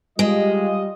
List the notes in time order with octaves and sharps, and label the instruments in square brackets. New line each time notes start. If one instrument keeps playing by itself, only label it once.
[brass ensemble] G3 F4 D#5 [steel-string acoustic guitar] G#3